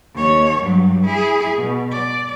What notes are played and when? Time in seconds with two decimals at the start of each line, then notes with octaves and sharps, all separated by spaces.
0.15 D#2 C#5
0.61 G2 F#3
1.05 E4 G#4
1.57 B2
1.92 D5